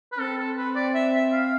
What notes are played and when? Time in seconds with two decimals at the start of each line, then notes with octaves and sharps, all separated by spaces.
0.12 B4
0.18 C4 A4
0.37 A4
0.57 B4
0.76 D5
0.94 E5
1.14 E5
1.33 F5